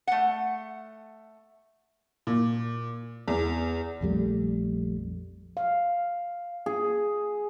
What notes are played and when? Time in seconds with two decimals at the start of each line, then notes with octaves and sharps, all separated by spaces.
0.07 A3 F#5
2.27 A#2
3.28 E2
4.01 A#1 F2 G3 A3
5.57 F5
6.66 G#4